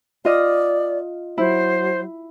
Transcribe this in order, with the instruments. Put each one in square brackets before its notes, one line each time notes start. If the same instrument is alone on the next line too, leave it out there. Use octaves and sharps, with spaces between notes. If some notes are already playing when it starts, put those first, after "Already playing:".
[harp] F4 D#5 F6 [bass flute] D5
[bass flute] F#3 [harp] E4 [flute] C5